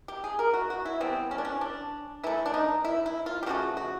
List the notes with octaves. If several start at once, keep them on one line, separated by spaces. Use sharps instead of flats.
G4
G#4
A#4
F#4
F#4
E4
E3 G3 B3 C4
C#4
D4
C#4
D4
E3 A3 E4
D4
D#4
E4
E4
F4
G4
C#3 F3 A3 F#4
F#4